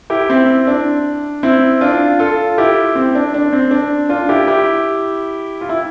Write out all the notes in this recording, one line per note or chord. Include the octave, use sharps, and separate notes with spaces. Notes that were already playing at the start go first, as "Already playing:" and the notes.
E4 G4
C4 E4
D4
C4 E4
D4 F4
F4 A4
E4 G4
C4
D4
D4
C4
D4
D4 F4
E4 G4
E4 G4
F4
E4